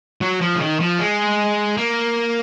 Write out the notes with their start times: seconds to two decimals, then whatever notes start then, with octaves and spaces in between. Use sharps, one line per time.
0.21 F#3
0.41 F3
0.56 C#3
0.60 D#3
0.80 F3
0.99 G#3
1.77 A#3